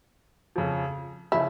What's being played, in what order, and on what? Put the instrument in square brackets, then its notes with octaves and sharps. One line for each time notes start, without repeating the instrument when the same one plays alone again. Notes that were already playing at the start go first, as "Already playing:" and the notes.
[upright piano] F2 C#3 F3
[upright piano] C#3 F3 [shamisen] E4